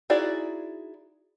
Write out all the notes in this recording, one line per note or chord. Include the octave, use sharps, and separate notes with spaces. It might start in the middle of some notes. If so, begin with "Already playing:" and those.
D#4 E4 F#4 G#4 D5